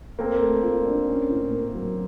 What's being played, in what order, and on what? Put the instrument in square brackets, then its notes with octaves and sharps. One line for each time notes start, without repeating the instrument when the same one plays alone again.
[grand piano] A#3 C4 [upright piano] A4
[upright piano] A3
F4
D4
C#4
A2
A#3
F#3